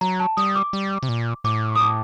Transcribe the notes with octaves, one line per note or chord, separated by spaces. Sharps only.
F#3 A#5
A5
G3 D#6
D6
G3
C3
A#2
A2 D6
D#6
D6